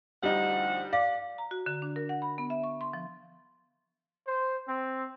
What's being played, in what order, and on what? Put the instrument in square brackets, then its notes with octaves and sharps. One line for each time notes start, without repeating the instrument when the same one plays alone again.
[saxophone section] D2 F3 F#5 [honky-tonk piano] G3 D#4
[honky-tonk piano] D5 [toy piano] F5
[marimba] A#5
F#4
D3
D4
A#4
F#5
B5
B3
E5
C#6
C6
F3
[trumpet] C5
C4